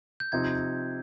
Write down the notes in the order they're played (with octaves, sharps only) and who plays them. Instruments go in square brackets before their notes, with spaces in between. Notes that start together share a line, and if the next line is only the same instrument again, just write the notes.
[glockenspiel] G6
[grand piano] C3 F3 C4 D#4 [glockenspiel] G#6